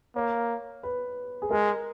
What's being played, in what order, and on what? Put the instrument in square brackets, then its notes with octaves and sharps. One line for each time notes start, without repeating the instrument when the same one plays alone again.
[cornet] A#3 [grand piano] C#5
[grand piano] B4
G#4
[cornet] G#3 [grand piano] A#4